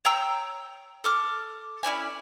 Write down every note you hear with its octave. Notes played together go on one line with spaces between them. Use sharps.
C#5 G5 A#5 E6
A4 D6 F6
C#4 E4 D5 G#5